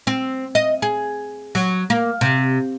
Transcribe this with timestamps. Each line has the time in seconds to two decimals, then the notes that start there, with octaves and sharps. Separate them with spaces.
0.07 C4
0.55 D#5
0.82 G#4
1.55 F#3
1.90 A#3
2.21 C3